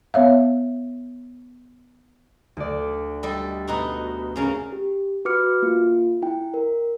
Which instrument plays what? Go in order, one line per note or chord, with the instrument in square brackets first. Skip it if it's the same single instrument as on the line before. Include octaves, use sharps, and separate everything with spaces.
[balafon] B3 C#5 E5 F5
[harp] D2 D5
[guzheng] G3 A4 D#5
B2 D#4 F#4
C#3 C#4 A#4
[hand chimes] G4
F#4 B4 D6 F6 C#7
A#3 F4
E4 G5
A#4